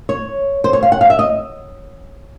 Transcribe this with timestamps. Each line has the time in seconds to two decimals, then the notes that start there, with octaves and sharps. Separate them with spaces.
0.09 C#5
0.64 C5
0.73 C#5
0.83 F5
0.92 F#5
1.01 F5
1.10 E5
1.19 D#5